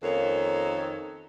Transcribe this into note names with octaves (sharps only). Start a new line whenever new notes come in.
F2 D#3 A#3 C#4 A4 C#5